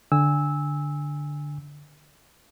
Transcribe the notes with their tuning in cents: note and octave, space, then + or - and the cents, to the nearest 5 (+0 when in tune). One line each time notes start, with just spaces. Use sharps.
D3 +0 G#5 -20 E6 -15